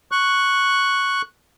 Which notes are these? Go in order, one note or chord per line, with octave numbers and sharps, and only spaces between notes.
C#6 F#6